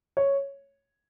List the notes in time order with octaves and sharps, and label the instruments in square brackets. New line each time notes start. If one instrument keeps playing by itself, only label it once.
[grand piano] C#5